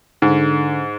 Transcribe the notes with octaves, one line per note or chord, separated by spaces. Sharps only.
G#2 D3